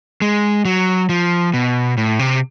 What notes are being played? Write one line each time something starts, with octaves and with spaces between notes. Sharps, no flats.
G#3
F#3
F3
B2
A2
C3